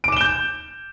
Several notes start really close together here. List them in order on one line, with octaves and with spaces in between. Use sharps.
D7 D6 E7 G7 G6